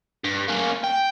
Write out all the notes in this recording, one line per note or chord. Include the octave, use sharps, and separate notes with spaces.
G2
A#3 C#4
G5